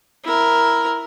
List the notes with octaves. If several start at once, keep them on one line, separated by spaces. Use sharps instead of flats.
E4 A#4